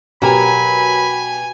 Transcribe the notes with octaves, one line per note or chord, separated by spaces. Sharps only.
B2 F#3 G4 A#4 G#5 A#5 B5